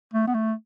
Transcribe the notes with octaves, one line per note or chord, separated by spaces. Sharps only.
A3
B3
A3